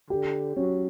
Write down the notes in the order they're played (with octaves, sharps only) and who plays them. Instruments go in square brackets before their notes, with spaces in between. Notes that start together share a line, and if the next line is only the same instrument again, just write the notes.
[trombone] D3 [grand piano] G4
[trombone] F#3 [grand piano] C#4